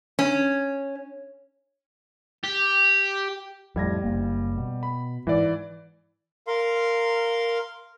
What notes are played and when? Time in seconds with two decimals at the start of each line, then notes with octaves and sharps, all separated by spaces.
0.19 C#4
2.44 G4
3.76 F2 A2 G3 G#6 A#6
4.04 F#1 A#3
4.57 B2
4.83 B5
5.27 G#2 E3 D5
6.47 A#4 F5 C6